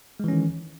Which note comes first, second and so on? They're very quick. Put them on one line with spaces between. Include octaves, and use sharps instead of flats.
G#3 E3 C#4 D#3